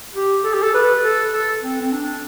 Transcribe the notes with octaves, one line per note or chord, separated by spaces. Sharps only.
G4
A4
G4
A4
B4
A4
A4
C4
C4
D4